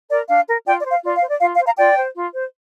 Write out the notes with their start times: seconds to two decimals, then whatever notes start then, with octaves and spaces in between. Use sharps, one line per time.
0.11 A#4 D5
0.29 D4 F5
0.48 A#4
0.66 F4 D5 G5
0.79 D5
0.85 C5
0.91 F5
1.03 F4 D5
1.16 F5
1.22 C5
1.29 D5
1.41 F4 F5
1.53 F5
1.59 C5
1.65 F5 A#5
1.78 F4 D5 G5
1.97 C5
2.15 F4
2.34 C5